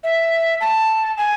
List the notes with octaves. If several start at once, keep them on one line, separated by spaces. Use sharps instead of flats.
E5
A5
G#5